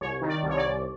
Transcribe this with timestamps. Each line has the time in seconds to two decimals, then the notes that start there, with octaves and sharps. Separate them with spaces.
0.01 C2 C#5
0.21 D#3
0.29 D5
0.43 C2
0.49 C#5
0.57 D5
0.63 C2